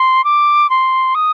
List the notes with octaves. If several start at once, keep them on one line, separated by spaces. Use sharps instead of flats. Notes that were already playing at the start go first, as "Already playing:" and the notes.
Already playing: C6
D6
C6
D#6